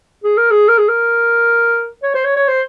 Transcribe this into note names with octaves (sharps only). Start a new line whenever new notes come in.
G#4
A#4
G#4
A#4
G#4
A#4
C#5
C5
C#5
C#5
C5